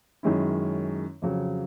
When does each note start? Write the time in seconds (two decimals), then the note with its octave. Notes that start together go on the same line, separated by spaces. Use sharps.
0.23 F#2 D#3 G#3 C#4 E4
1.22 F2 C#3 F#3